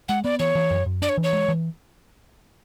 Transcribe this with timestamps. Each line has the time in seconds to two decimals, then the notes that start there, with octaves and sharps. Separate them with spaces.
0.09 G#3 F#5
0.24 B3 D5
0.40 E3 C#5
0.55 E3
0.71 F#2
0.86 F#2
1.02 D4 D5
1.09 C#5
1.17 E3
1.23 C#5
1.33 G#3
1.49 E3